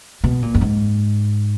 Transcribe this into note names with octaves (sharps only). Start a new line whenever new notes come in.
B2
A#2
F#2
G#2